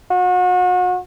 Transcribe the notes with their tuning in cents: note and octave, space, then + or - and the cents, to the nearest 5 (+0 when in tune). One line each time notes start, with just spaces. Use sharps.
F#4 -35